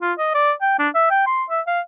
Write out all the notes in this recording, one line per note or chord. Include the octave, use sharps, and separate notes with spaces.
F4
D#5
D5
G5
D4
E5
G5
C6
E5
F5